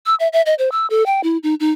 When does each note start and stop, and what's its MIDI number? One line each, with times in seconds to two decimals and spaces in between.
0.06 0.15 88
0.20 0.28 76
0.33 0.42 76
0.46 0.54 75
0.59 0.71 72
0.72 0.86 88
0.90 1.06 69
1.06 1.21 79
1.23 1.38 64
1.43 1.55 63
1.60 1.71 63